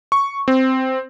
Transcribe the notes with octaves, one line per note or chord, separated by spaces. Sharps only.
C#6
C4